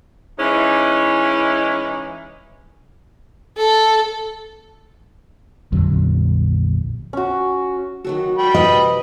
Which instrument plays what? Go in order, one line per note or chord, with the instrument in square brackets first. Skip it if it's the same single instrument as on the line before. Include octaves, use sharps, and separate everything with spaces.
[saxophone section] E3 G#3 C#4 D#4 E4
[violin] A4
[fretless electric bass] A#1 F2 D3 F#3
[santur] C#4 F#4
[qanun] D#3 F#3 A4 [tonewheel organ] F#4
[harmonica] G5 B5
[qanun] C3 E3 [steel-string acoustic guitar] D#5